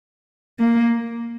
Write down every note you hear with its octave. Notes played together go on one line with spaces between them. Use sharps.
A#3